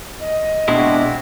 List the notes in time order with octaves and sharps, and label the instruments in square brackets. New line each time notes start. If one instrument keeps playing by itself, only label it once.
[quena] D#5
[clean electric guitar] B2 G#3 E4 [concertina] C4 F#4 [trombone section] D4